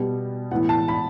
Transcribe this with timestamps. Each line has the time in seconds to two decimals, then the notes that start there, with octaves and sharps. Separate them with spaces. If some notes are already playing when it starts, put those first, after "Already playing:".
Already playing: B2 G3 B3
0.51 A2 E3 B3 F#5
0.69 A5
0.88 B5